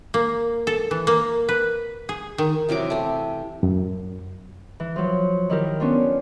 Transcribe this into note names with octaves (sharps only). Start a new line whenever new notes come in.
A#3
A4
E3
A#3
B4
G#4
D#3
C3 E3 F#3 D6
A3 C4
F#2
E3
F3 F#3
D#3 E4 G4 A#4
B3 C#4 D4 F4